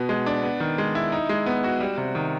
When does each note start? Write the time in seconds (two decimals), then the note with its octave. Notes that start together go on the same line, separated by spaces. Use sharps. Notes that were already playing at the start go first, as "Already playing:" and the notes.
Already playing: B2 B3
0.09 G#3
0.26 D4
0.43 B3
0.60 D#3
0.78 G#3
0.95 E4
1.12 D#4
1.29 G#3
1.46 B3
1.64 F#4
1.80 G3
1.98 C3
2.15 D#3